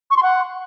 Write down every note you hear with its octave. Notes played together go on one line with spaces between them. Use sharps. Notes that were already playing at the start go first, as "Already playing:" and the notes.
C#6
C6
F#5